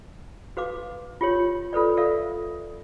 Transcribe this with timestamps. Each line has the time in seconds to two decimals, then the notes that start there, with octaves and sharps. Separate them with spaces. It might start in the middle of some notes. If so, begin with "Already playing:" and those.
0.57 F#4 B4 F5 D6
1.21 F4 G4 C#5
1.73 F4 A4 B4 D5
1.97 A4 A#4 D5 E5 F5